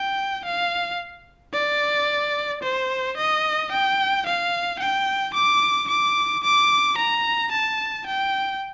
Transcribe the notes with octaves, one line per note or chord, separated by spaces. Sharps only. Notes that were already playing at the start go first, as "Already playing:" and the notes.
Already playing: G5
F5
D5
C5
D#5
G5
F5
G5
D6
D6
D6
A#5
A5
G5